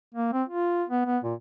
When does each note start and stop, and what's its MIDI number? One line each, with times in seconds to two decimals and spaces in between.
0.14 0.33 58
0.33 0.43 60
0.49 0.84 65
0.89 1.05 59
1.06 1.18 59
1.24 1.34 46